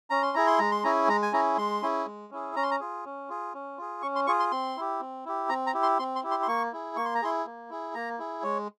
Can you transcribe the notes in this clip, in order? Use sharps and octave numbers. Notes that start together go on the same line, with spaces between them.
C#4 A#5
C6
E4 G#4 A#5
C6
G#3 A#5
C6
C#4 E4 G#4 A#5
G#3 A#5
G#5
C#4 E4 G#4 A#5
G#3 C6
C#4 E4 G#4
G#3
C#4 E4 G#4
C#4 A#5
C6
A#5
F4 G#4
C#4
F4 G#4
C#4
F4 G#4
C#4 C#6
C6
F4 G#4 C#6
C6
C4 C6
E4 G4
C4
E4 G4
C4 A#5
A#5
E4 G4
C6
C4 C6
C6
E4 G4
C6
C6
A#3 C#6
E4 G#4
A#3 C#6
C6
A#5
E4 G#4 C6
A#3
E4 G#4
A#3 A#5
E4 G#4
G#3 C#5